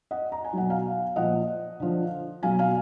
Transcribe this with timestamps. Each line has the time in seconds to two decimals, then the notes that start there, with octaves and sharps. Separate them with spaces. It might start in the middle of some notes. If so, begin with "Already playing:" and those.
0.11 D#5 F#5
0.32 A#5
0.45 G#5
0.53 B2 F#3 F#5
0.70 F5 G#5
1.16 A#2 F3 D#5 F#5
1.80 D3 F3
2.43 B2 F#3 F5 G#5
2.59 F5 G#5